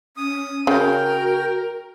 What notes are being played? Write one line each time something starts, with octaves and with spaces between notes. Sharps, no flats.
C#4 D#6
C#3 F#4 A#4 G5